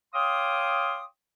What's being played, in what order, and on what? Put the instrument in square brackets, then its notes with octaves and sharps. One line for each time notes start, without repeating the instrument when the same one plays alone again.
[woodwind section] C#5 F5 G5 C6 D6 D#6